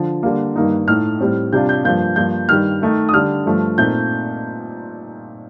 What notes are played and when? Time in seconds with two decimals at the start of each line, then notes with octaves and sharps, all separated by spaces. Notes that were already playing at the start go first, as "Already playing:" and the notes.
Already playing: D3 F3
0.23 D3 G3 A#3
0.56 G2 D#3 A#3 D#4
0.88 A2 A3 D#4 F6
1.20 A2 G3 C4
1.53 C3 G3 D4 F4 G6
1.69 G6
1.84 G2 F3 A#3 G6
2.16 G2 F3 A#3 F4 G6
2.48 G2 D#3 G3 F6
2.82 D#3 A3 D#4
3.09 D#6
3.13 D3 G3 D4 F6
3.46 G2 F3 A3
3.78 A#2 A3 C4 D#4 G6